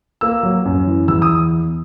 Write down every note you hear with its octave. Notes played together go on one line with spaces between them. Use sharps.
A#3 E6
F#3
F#2
E3
E2 E6
D#6